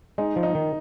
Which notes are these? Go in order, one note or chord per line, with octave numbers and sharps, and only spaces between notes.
G#3 D#4
F3
D#4
D#3